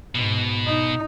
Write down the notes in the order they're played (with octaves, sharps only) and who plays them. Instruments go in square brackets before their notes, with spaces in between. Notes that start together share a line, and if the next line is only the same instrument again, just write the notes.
[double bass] G#2 [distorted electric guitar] B2
[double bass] D#4